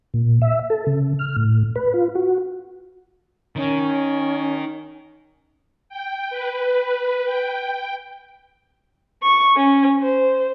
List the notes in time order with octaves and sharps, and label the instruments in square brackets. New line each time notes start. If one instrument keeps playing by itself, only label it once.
[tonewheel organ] A#2
E5
A4
C#3
F6
A2
B4
F4
F#4
[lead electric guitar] D#3 D#4 [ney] C#4
[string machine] G5
B4
G5
[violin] C#6
C#4
C5